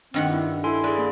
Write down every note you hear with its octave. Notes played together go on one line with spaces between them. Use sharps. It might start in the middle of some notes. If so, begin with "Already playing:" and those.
G2 D#3 C4 F#5
E4
E4 A4 G#5 C6
G#4 B4 D5
A#3